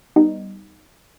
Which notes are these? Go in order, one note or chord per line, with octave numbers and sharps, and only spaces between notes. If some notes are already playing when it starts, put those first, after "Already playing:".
G3 B3 D#4